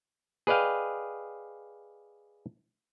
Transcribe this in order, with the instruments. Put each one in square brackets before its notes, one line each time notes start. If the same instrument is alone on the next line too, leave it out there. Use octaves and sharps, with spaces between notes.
[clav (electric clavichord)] G#4 B4 D5 D#5 F5 G5